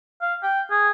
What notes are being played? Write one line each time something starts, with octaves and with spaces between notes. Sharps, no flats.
F5
G5
G#4